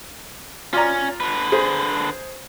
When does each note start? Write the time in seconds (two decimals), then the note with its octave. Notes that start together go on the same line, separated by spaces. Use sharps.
0.73 C#4 F4 D5 A#5
1.21 D3 B4
1.52 G#4 C5